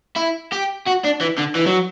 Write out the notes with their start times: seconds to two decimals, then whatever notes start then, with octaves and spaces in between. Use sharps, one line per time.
0.16 E4
0.52 G4
0.86 F#4
1.04 D4
1.21 E3
1.38 D3
1.56 E3
1.67 F#3